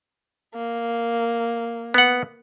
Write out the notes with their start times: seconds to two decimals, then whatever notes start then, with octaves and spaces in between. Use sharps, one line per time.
0.55 A#3
1.94 B3 F#5